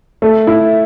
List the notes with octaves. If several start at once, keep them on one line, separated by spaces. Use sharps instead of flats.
A3
E4